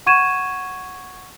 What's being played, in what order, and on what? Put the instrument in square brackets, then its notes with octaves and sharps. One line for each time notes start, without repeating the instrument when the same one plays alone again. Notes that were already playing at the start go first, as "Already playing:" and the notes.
[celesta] F#5 C#6 G#6 D#7 E7